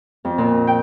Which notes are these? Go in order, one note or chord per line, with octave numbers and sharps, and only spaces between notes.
F2
A#2
G5